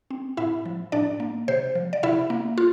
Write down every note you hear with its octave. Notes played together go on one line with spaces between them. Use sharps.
C4
A2 E4 E5
F3
A2 D4 D5
A#3
C3 C5
F3
D5
C3 E4 E5
A#3
F4